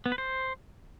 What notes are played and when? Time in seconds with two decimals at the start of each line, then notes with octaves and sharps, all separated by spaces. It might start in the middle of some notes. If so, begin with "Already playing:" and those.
0.06 B3
0.12 B4
0.18 C5